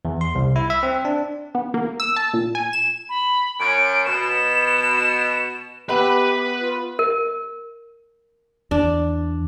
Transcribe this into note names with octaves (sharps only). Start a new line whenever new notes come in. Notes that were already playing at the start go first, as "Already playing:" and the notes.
E2
C6
C2
E4
E5
C4
D4
B3
A#3
E6
A5
A#2
G#5
E7
B5
F#2 C#4 D7
B2 E7
B3 G4 B4 E5 B5 E6
F4
A#4
E2 D4